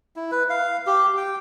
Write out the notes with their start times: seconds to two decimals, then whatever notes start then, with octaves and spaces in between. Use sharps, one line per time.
0.16 E4
0.32 B4
0.50 F5
0.87 G4
1.17 G5